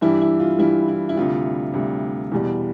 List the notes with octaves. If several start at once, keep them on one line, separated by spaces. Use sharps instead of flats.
G2 E3 G3 E4 G4
E4
F4
G2 E3 G3 E4
E4
E4
D2 C3 G3 F4
D2 C3 G3
E2 B2 G3